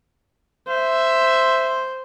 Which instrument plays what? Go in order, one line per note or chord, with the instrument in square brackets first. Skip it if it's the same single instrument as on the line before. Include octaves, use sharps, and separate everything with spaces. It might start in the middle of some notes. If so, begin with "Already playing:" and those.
[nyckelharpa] C5 [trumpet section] E5